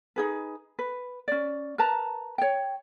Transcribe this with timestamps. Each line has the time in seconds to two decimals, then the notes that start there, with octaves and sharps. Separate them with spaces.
0.16 D#4 G#4 B4
0.79 B4
1.28 C#4 D5
1.78 A#4 B4 A5 A#5
2.38 C#5 G5